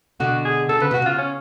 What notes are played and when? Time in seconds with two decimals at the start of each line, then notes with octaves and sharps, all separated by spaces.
0.20 B2 D3 F#4
0.45 G#4
0.69 D3 A4
0.80 C#3 B4
0.91 B2 F#4
1.02 C#3 F4
1.18 C#4